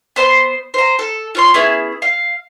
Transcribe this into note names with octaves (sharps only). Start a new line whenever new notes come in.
B3 C5 A#5 C6
C5 A#5
A4
F4 C#5 C6
B3 C#4 E4 G#4
F5